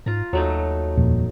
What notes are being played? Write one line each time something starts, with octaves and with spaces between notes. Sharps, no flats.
G#2 F4 A#5
D#2 F#3 A3 D#4
D#1 F2 A#2